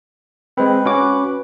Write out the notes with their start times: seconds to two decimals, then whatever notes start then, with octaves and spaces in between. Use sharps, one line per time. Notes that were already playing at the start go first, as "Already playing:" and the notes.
0.57 G#3 C4 B4
0.85 C#4 F#4 D6